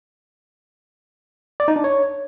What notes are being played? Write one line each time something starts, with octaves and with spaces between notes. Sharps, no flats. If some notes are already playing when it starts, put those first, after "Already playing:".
D5
D#4
D4
C#5